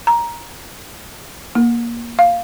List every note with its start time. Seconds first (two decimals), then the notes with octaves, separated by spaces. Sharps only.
0.07 A#5
1.55 A#3
2.19 F5